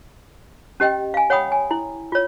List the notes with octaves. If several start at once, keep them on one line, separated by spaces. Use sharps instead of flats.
C#4 G4 D#5 G5
F5 G#5
C#5 F#5 G5 B5 D#6
G#5
E4
F4 C#5